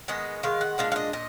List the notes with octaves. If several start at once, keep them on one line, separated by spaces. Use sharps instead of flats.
D#3 G#3 B3 D#5
D#3 G#3 F5
F#5
A#2 G#3 D4 F5
F5
D#5
A#2 D#5